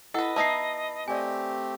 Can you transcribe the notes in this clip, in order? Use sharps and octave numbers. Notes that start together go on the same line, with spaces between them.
E4 A4 B4 D#5 F#5
B3 D#4 E4 A5 A#6 C7
A3 C4 G4 D5 G#5